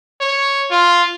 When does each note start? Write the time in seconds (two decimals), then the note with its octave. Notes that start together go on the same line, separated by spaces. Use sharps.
0.21 C#5
0.71 F4